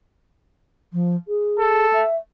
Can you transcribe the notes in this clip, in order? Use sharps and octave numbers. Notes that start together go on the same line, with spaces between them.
F3
G#4
A4
E5